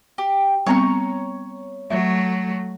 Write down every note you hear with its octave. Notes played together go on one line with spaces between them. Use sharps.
G4
G3 B3 C4 C#5 A#5 C#6
F#3 A3 E5